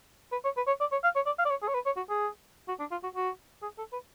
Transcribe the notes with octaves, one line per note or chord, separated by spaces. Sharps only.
B4
C#5
B4
C#5
D5
C#5
F5
C#5
D5
F5
D5
C#5
G#4
C#5
B4
C#5
F#4
G#4
F#4
D4
F4
F#4
F#4
G#4
A4
B4